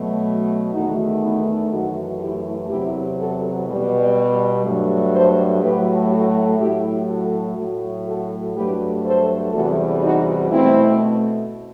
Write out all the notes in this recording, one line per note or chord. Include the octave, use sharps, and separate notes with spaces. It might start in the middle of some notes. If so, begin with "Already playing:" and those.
Already playing: B2 F#3 A3
E2 D#3 A3 D#4 F#4
B3 D#4
F#2 E3 A3 D#4 F#4
E4 G4
E2 C3 F#3 E4 G4
F#4 A4
B2 G3
G2 F#3 A3
A4 C5
A2 F#3 A3 G4 B4
F#4 A4
A2 F#3 A3 E4 G4
F#4 A4
A2 F#3 A3
F#4 A4
G2 F#3 A3 G4 B4
A4 C5
E2 C3 E3 G3 F#4 A4
D#4 F#4
B2 A3 C4 E4